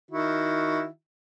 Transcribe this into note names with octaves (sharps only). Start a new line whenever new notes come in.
D#3 E4 F#4